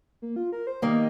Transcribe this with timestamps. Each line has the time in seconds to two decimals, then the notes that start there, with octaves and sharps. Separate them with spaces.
0.22 A#3
0.36 F4
0.52 A#4
0.67 C5
0.82 D#3 G3 A#3 D#5